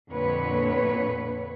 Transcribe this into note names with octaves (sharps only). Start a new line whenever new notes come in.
F2 A#2 D3 B4 C#5